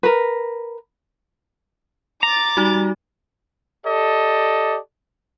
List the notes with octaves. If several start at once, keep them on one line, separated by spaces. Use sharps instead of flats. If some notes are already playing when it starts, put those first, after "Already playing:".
A#4 B4
A#5 D6 A6
G3 D#4 F#4
G4 A4 D5 D#5